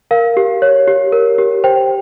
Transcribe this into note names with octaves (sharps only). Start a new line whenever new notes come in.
A#4 F5
G4
C#5
G4
A#4
G4
C5 G5